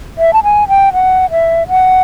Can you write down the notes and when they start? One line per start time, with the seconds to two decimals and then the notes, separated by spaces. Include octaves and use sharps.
0.18 E5
0.33 A5
0.43 G#5
0.68 G5
0.93 F#5
1.31 E5
1.68 F#5